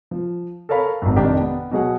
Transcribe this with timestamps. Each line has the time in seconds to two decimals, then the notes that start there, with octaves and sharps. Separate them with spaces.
0.11 F3
0.69 A4 A#4 C#5 F5 B5
1.02 G#1 F#2
1.16 F2 C3 D#3 D4 G4
1.41 B3
1.71 B2 F#3 G#4 F#5